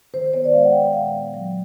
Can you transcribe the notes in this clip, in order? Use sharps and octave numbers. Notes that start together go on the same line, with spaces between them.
D#3 C5
C5
B3 C#5
D5
G#3 F5
F#5
D#3 G5
G5
A#2 F5
B3
F#3